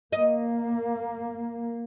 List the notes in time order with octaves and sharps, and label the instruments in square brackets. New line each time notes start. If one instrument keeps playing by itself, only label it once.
[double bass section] A#3 [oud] D#5